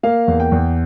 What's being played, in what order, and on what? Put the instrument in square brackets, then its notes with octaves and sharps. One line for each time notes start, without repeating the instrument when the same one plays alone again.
[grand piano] A#3 F5
E2
G5
E2